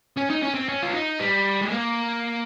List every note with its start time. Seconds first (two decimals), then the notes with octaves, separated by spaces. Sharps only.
0.17 C#4
0.30 D#4
0.43 C#4
0.55 C4
0.69 C#4
0.83 F4
0.94 D#4
1.19 G3
1.62 G#3
1.70 A#3